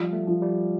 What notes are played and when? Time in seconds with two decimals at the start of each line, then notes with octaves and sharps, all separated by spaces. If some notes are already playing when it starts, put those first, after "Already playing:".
Already playing: F3 G3
0.13 A3
0.27 F3
0.42 G3